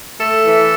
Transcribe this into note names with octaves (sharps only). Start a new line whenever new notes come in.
A3 A4
E3